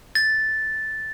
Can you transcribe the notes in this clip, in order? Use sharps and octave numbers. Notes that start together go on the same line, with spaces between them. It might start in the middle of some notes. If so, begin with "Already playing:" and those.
A6